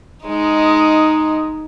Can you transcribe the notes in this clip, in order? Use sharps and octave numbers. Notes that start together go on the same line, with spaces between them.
G#3 D#4